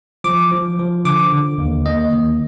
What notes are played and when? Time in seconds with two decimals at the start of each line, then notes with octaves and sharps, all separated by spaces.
0.24 F3 D6
0.51 F3
0.79 F3
1.05 D3 D6
1.32 D3
1.58 D#2
1.86 A#3 D#5
2.13 D#3